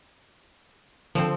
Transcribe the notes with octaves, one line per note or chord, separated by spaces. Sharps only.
D3 F3 C4 A4